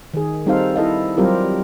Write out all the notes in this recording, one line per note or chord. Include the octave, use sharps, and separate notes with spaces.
D#3 G#4
G3 C4 D#4 A4 C5 F5
E4 A4 D#5 F5
F#3 G3 C4 F4 G4 A#4